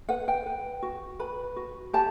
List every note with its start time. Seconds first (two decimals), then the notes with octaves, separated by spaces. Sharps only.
0.09 B4 F#5
0.28 G5
0.46 B4
0.82 F#4
1.19 B4 B5
1.56 F#4
1.93 G4 A5